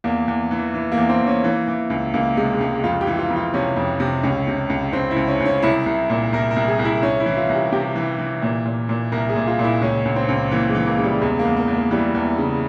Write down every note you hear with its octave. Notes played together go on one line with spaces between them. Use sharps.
E2 A#3
E2
E3
E3
A#3
E2
C4
E2
C#4
E3 A#3
E3
C#2
C#2 A#3
C3 G#3
C#2 G#3
F2 F4
G4
E3
F4
F2
F4
C3 C#4
F2
C3
C#2 C#4
C3
C#2
C#2 C4
E4
C#2
C#4
C#2
C#4
C2 E4
C2
A#2
C2 A#4
A#4
C2
G#4
C2
E4
C2 C#4
E4
E3
F4
C2
G4
C3 G4
E3
E3
A#2
A#2
A#2
C2 A#4
G#4
A#2
F4
A#2
E4
C#2 C#4
C#2
C4
C#2
E3 A#3
G#3
E3
A#3
C#3
G3
E2 G#3
A#3
E2
A#3
E2
A#3
E3 G3
E2
C#3